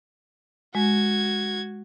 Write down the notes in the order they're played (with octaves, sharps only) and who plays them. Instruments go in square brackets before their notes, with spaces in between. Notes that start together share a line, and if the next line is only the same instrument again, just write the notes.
[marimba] G#3 [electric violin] F#4 G#6